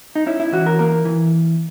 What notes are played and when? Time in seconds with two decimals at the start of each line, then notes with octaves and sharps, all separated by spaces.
0.16 D#4
0.26 C#4 E4
0.40 E4
0.52 E3 F#4
0.66 A#4
0.79 A#3 A#4
1.05 E3